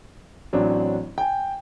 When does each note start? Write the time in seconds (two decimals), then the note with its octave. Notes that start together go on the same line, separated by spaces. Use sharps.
0.53 A1 F#3 C4 D4
1.18 G5 G#5